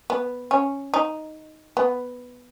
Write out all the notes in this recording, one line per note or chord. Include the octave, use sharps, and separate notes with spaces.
B3
C#4
D#4
B3